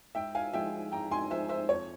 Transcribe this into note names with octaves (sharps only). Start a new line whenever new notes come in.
G#2 E5 G5
F5 G#5
F3 G#3 E5 G5
G#2 G5 A#5
G#5 C6
F3 G#3 C5 E5
C5 E5
F2 C#5